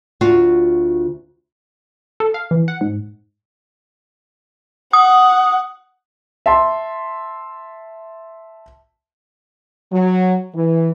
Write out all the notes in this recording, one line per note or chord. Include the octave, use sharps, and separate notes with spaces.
D2 F4 F#4
A4
F5
E3
F#5
G#2
F#5 D#6
E5 A5 C6
F#3
E3